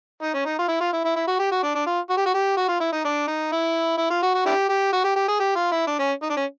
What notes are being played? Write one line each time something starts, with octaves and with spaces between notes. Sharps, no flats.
D#4
C#4
D#4
F4
E4
F4
E4
E4
E4
F#4
G4
F#4
D4
D4
F4
F#4
G4
F#4
G4
F#4
F4
E4
D#4
D4
D#4
E4
E4
F4
F#4
F#4
D4 E4 G4
G4
F#4
G4
G4
G#4
G4
F4
E4
D4
C#4
D#4
D4
C#4